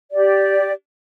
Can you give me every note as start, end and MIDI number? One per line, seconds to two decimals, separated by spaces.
0.11 0.72 67
0.11 0.72 74